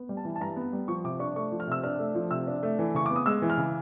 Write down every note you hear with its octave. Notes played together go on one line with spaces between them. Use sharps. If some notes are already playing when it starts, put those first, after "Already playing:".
Already playing: B3
G3
A5
E3
A5
G2 A#5
B3
G3
F3 C#6
C3 D6
D4 C#6
A3 C#6
F3
F6
C3 E6
D4 F6
A3
F3
C3 E6
D4
A3
E3
C#3 C#6
B3 D6
D#6
G#3 E6
E3
F6
C#3